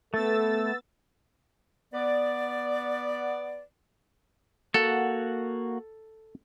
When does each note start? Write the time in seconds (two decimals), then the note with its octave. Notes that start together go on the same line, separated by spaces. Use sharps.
0.14 A3 B3 A4 E6 A6
1.94 B3 D5
4.74 A#3 F#4 A4 F#5